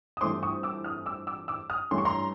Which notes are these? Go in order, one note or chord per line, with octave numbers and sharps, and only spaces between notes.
D#6
G2 E3 A3 C4 C6 D6
C#6 D#6
D6 E6
D#6 F6
D6 E6
D6 E6
D6 E6
D#6 F6
G2 E3 A3 C#4 C6
C#6
A#5 C6